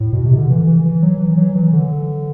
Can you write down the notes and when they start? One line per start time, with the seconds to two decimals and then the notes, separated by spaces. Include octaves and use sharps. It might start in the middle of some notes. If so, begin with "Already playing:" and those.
0.00 A2
0.13 B2
0.25 C3
0.37 D3
0.50 E3
0.67 E3
0.85 E3
1.02 F#3
1.20 E3
1.37 F#3
1.55 E3
1.73 D3